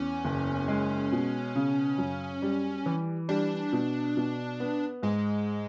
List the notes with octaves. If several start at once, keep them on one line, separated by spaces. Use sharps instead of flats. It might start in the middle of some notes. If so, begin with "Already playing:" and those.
Already playing: E2 C#4
F#1
G#3
B2
C#3
F#2
G3
E3
G3 D4
B2
B2
B3
G#2 G#3